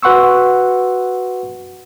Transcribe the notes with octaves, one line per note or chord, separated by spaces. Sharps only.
F#4 B4 F#5 C6 C#6 E6